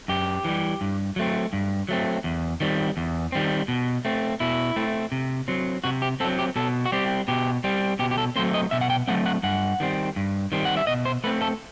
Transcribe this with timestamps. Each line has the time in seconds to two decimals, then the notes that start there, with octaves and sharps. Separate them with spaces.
0.08 F#2 G4
0.44 E3 G3
0.81 G2
1.16 F#3 A3 C4
1.53 G2
1.89 F#3 A3 C4
2.24 E2
2.60 D#3 G3 C4
2.97 E2
3.32 D#3 G3 C4
3.68 B2
4.05 A3 C4
4.40 B2 E4
4.76 A3 C4
5.12 C3
5.48 F#3 C4
5.84 C3 F#4
6.02 G4
6.20 C4 A4
6.24 F#3
6.39 G4
6.56 B2 A4
6.86 F#4
6.92 G3 C4 G4
7.28 B2 G4
7.64 G3 C4
7.99 B2 G4
8.11 G4
8.18 A4
8.36 F#3 A3 C4 C5
8.54 D#5
8.71 B2 E5
8.81 F#5
8.90 G5
9.08 F#3 A3 C4 F#5
9.26 F#5
9.43 G2 F#5
9.80 D#3 G3 C4
10.16 G2
10.52 D#3 G3 C4
10.65 F#5
10.77 E5
10.87 B2 D#5
11.05 C5
11.24 A3 B4
11.27 C4
11.42 A4